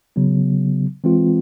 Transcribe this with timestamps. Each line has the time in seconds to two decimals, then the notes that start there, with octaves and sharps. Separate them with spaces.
0.16 C#3 F#3 B3
1.04 E3 G#3 C4 F4